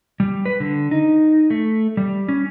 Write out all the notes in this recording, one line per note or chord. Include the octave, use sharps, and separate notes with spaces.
G3
B4
D3
D#4
A3
G3
C#4